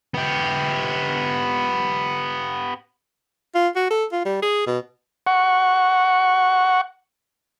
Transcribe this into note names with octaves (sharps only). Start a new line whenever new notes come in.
B3 G4
F4
F#4
A4
F4
G3
G#4
B2
F#5 C#6